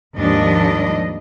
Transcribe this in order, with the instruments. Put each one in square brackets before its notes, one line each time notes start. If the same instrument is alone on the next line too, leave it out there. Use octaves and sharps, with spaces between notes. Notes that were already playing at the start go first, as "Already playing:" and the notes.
[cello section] D#2 G#2 F3 G3 D4 D#5